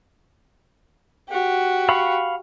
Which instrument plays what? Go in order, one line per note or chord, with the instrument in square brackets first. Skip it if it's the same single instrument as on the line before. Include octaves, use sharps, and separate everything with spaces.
[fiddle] F#4 G4
[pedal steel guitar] F5 B5 C#6